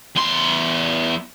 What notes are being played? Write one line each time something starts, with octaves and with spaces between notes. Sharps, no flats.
E2 C6